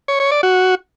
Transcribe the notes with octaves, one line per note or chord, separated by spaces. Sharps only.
C#5
C#5
D5
F#4